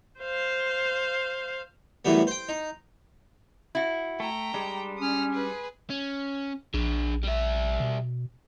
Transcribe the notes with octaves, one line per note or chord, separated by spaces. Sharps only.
C5 F5
F#2 A2 E3 G3 B3
C5 G5
D#4
E4 F#4
A3 G5 A#5
G3 G#3 D4
C#4 D#6 F6
G#4 B4
C#4
A#1 D4 G#4
G3 E5
B2